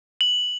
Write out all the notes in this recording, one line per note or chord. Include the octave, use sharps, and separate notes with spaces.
F#7